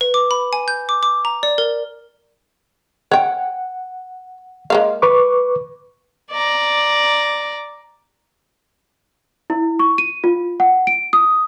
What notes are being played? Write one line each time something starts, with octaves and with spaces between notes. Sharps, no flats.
B4
D6
B5
G#5
G6
D6
D6
A#5
D5
A#4
C#5 F#5 G5
G#3 A#3 F5
B4 C#6 D6
D5 A#5
E4
C#6
D#7
F4
F#5
D7
D#6